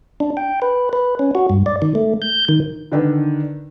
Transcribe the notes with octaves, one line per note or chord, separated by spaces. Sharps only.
D4
G5
B4
B4
C#4
F#4
G2
D5
D#3
A3
G6
D#3
D3 D#3 D4 B4